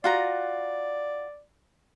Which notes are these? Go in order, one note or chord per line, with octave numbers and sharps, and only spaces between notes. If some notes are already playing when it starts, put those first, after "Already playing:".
F4 F#4 D5 A#5